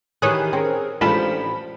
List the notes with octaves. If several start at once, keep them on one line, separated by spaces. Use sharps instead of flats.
D#3 E3 G4 G#4 B4 C#5 D#6 F#6
C4 C#4 G#4 A#4
A1 F3 G#3 D4 F4 A5 B5